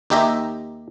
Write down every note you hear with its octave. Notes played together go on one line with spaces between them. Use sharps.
D#2 D#4 G4 E5 A#5